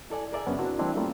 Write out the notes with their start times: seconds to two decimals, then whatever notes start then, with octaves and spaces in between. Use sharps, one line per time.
0.10 E4 A4 D5 G#5
0.32 G#4 A#4 D5 E5 G#5
0.46 F#2 C#3 B3 C#4 D4
0.59 C4 D4 E4 F#4 A#4
0.79 E3 G3 A3 C4 D4 E4
0.96 G3 A3 A#3 C4 C#4 F4